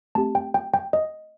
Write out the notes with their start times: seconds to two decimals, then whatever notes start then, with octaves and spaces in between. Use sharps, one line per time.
0.15 A3 C4 G4 A5
0.35 G5
0.54 G5
0.74 G5
0.93 D#5